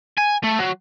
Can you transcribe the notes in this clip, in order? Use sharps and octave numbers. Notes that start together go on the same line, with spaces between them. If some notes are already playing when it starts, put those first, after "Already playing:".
G#5
A3
F#3